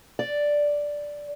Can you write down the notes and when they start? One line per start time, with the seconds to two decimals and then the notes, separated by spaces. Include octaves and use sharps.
0.19 D5